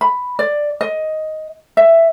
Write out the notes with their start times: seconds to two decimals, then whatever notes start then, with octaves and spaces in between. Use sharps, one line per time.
0.01 B5
0.39 D5
0.81 D#5
1.77 E5